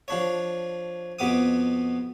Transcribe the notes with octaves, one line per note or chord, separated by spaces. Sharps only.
F3 D4 C#5
F2 B2 B3 D6 D#6